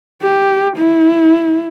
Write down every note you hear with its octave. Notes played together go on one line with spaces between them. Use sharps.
G4
E4